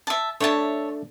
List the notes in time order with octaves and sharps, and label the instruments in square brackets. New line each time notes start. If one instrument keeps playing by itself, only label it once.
[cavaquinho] E5 A5
[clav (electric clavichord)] A3 D4 [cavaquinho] C#5 E5 A5